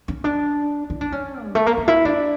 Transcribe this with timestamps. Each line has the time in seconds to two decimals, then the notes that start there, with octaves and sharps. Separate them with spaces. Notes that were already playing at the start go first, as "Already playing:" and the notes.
0.08 C#4
0.24 D4
0.90 E4
1.01 D4
1.12 C#4
1.44 G3
1.55 A3
1.66 A#3
1.77 C#4
1.88 E4
2.05 D4